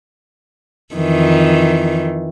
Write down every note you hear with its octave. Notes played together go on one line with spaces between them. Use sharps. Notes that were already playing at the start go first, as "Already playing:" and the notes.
F2 D#3 E3